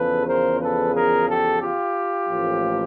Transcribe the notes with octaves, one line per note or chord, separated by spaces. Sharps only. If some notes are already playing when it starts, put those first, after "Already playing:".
Already playing: E2 C#3 F3 A4 B4
A#4 C5
A4 B4
G#4 A#4
G4 A4
F4 G4
A1 A2 F3 A#3